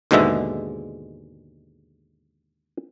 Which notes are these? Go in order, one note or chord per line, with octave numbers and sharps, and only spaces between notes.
D#2 G#2 B2 D3 G#3 E5